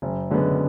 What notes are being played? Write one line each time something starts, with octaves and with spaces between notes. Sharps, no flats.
F#1
F#2 D3 G#3 B3